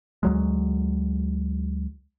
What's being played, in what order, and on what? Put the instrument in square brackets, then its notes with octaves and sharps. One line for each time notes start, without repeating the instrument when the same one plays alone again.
[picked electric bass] D2 F#3 G#3